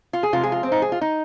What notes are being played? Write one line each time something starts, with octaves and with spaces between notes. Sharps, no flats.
F4
G#4
C3 F3 G#3 F4
G#4
F4
C4
D#4
G#4
F4
D#4